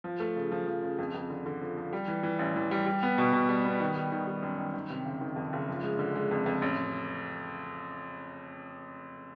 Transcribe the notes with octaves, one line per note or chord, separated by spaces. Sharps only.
F3
A3
C#3
F3
F3
C#3
F2
F2
D3
D3
F3
F3
G3
E3
E3
A1
E3
G3
G3
B3
B2
B2
G3
B3
D#3
G3
D#3
G3
F#2
D#3
D#3
C3
F#1
D#3
F2
F#1
F3
G#3
D3
G#3
F2
F2
A1